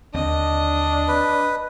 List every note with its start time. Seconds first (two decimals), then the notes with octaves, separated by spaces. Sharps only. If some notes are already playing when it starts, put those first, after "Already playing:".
0.15 D#2 D3 C4 D4 D#5
1.08 B4